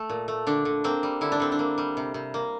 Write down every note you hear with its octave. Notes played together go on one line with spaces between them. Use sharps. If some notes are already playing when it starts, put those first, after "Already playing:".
Already playing: A3
A#2
A3
D3 D4
D3
A#3 C4
G3
D3 E4
D4
D3 C4
D4
A#3
G3
C3
C3
A#3